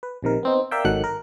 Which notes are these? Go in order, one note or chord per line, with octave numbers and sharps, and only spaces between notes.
B4
A#1 C3 D#3 A#4
B3 C4 D#4
A#4 D5 E5 F5 G5
G#1 D#3 F#3 A4 F#5 F#6
A#4